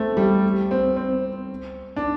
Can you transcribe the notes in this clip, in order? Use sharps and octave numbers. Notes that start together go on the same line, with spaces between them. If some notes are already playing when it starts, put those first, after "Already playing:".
Already playing: A3 C4
G3
C4
C4
D4